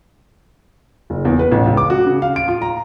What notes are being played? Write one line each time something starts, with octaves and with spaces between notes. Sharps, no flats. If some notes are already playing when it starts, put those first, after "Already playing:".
F#1
E2
B4
A1
C#2
D6
F#4
C#3
F5
D7
F4
A#5